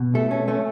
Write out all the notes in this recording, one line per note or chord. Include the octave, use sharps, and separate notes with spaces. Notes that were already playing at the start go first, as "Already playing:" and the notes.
Already playing: B2
A3 A4
C#4
A3 C#4